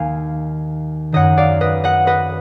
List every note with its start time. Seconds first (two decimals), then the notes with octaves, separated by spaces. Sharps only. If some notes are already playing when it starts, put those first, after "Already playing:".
Already playing: D#2 D#3 F5 G#5
1.12 F#2 D#3 D#5 F#5
1.37 D5 F5
1.61 B4 D#5
1.84 D#5 F#5
2.07 B4 D#5